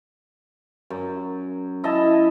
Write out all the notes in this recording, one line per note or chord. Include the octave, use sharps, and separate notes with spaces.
F#2
E4 D#5 E5 A5